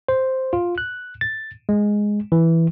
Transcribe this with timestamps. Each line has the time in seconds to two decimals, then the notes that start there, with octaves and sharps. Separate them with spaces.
0.08 C5
0.53 F4
0.78 F#6
1.21 A6
1.69 G#3
2.32 E3